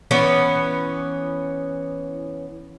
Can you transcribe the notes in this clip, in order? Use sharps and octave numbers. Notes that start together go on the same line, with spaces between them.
E3 B3 C#4 B4